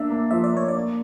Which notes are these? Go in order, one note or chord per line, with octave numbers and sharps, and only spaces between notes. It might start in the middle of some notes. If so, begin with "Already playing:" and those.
Already playing: A#3 D4 E5
A#3
F3 E5
D5
A#3 C#5
D5
A#3